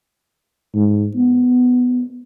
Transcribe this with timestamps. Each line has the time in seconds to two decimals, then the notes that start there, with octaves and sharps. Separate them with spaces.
0.75 G#2
1.16 B3